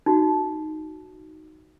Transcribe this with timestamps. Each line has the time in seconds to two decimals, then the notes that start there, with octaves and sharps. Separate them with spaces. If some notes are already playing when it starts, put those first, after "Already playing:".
0.06 D#4 F#4